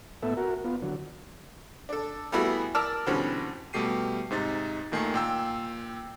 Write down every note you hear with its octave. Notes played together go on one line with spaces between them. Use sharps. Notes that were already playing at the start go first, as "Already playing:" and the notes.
A2 B3 A4 E5
F#4 A#4
B3 F4
D3 F#3
D4 A4
G3 A3 B3 E4 F#4 G#4
A#4 D5 A5 D6 E6 F6
B2 D3 E3 G3 C4 C#4
B2 G3 A3 G4 C7 D#7
G#2 C3 D#4 A6
D#2 A#2 D#3 A3 G#5 C7
A#2 G5 E6